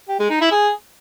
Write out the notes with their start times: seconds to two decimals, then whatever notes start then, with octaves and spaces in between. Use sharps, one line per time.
0.09 G4
0.19 G#3
0.30 D#4
0.41 E4
0.52 G#4